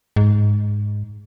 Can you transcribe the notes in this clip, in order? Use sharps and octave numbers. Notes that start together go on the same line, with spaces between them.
G#2